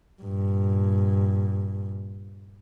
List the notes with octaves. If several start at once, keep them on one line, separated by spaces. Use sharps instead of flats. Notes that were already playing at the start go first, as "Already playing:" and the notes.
G2 A#2